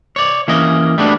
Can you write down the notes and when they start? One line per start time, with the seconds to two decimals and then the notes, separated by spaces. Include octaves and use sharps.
0.16 C#5 D5
0.48 E3 A#3 C#4 D#5
0.98 G3 A3 B3 D4